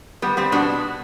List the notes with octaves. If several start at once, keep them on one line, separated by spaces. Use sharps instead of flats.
G3 B3
G3 C4
B2 B3 D4